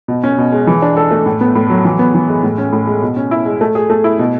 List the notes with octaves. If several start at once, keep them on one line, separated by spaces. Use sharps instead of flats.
B2
C#4
B2
G#3
E3
D4
A4
A3
A2
B3
A2
F#3
E3
B3
E3
G#3
A2
C#4
A2
G#3
B2
C#4
E4
G#3
A3
G#4
A3
E4
B2